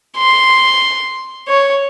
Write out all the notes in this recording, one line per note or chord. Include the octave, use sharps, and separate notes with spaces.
C6
C#5